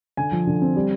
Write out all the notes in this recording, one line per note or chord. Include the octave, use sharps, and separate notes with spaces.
D3 G#5
F3
D3
C4
G3